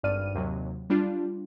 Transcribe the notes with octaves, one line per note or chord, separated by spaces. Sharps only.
G#1 G2 D5 F6 D#7
D#2 C3 F#3
G3 D4 F4